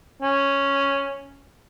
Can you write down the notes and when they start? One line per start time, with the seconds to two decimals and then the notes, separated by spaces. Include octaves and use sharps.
0.23 C#4